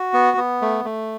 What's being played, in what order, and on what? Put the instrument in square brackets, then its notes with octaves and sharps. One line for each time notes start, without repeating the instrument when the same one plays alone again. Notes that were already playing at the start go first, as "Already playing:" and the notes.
Already playing: [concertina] F#4
B3
B3
A3
A3